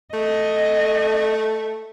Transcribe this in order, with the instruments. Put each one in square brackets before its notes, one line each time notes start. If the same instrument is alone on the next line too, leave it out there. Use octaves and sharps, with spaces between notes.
[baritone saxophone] A3 [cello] D#5